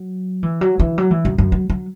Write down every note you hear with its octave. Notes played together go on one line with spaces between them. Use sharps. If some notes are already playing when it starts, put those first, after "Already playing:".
Already playing: F#3
E3
F#3
E3
F#3
E3
F#2
F#2
F#3
F#3